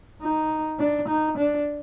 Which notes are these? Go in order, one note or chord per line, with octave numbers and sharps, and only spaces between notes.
D#4
D4
D#4
D4